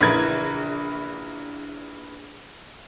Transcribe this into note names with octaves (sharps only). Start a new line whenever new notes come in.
A#1 C#3 E3 A#4 B4 G#6